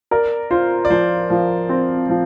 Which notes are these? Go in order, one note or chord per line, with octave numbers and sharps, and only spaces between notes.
A#4 D5
F4 C5
D5
F3 C5
F3
C4
F3